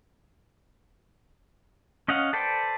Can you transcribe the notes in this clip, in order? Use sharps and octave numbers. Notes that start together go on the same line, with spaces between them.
C#4 D#5 F5 F#5
A4 B4 C5 D5 G5